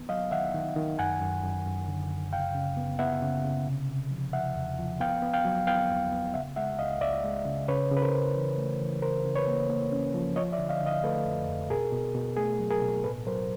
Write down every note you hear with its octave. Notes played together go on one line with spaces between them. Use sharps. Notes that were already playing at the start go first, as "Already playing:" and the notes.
Already playing: D#3 B3
F#3 D#5 F5
D#3 E5 F#5
D#3
D#3
F#2 F#5 G#5
F#2
F#2
F#2
D3
F#2
C#3 F5 G5
C#3
B3
B3 E5 F#5
C#3
C#3
C3
C3
F3
F3 E5 F#5
E2
F3
B3 F5 G5
B3
F5 G5
F#3
B3 F5 G5
E2
B3
C#3 E5 F#5
G#3 E5 F#5
C#2 D#5 F5
C#2 D5 E5
G#3
C#3
C#3 B4 C#5
C#3
B4
A#4 C5
C#3
E3
A3
E3
C#3 A#4 C5
C#3
B4 C#5
A#3
A#3
C#4
F3
F3 C#5 D#5
D5 E5
D3
D#5 F5
D3
D#5 F5
A3 A4 B4
F2
F2
B2 G#4 A#4
B2
B2
A3 G#4
F#3
G#4 A#4
B2
A2 A4 B4
F#3 A#4 C5